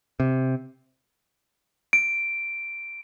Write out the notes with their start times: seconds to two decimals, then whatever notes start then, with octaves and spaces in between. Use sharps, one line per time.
0.20 C3
1.93 D7